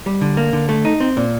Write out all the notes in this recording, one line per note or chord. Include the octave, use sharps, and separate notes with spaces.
G3
D3
A#3
D3
A3
D#4
C4
A#2